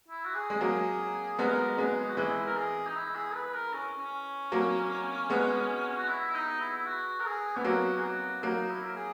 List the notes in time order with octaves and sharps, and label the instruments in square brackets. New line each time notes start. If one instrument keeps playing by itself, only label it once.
[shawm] E4
F#4
G#4
[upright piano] G#3
[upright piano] F#3 A#3 [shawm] G#4
[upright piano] G#3 B3 [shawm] A#4
[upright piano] G#3 B3 [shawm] G#4
[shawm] F#4
[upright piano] E3 G#3 [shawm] E4
[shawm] A#4
G#4
D#4
E4
G#4
B4
A#4
C#4
C#4
[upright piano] F#3 A#3
G#3 B3
[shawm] F#4
E4
E4
D#4
E4
E4
F#4
A#4
G#4
[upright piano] B3 [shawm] E4
[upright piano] F#3 A#3 [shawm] F#4
[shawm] G#4
F#4
[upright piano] F#3 A#3 [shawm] D#4
[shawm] E4
A#4
G#4